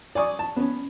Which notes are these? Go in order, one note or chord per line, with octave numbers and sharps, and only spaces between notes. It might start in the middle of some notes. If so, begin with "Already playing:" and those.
D5 G#5 C#6 D#6
A5
B3 C#4